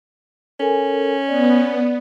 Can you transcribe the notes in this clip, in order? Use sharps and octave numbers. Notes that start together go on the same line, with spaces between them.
C#4 A4 A#4 G#5
B3 D5